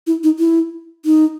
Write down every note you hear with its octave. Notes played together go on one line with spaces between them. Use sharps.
E4
D#4
E4
D#4